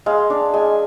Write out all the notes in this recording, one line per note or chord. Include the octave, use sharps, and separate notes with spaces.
G#3 F5
D4
G#3 G#5